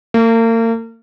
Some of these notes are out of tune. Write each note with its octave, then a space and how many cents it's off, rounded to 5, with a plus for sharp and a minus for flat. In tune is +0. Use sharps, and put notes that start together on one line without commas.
A#3 -40